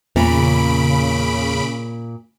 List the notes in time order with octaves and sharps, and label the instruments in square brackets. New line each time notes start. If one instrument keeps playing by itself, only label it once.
[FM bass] E2 [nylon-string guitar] A#2 [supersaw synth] C#3 B5 D7